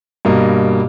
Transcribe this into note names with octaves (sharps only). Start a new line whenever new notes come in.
G2 B2 A#3 D#5 A#5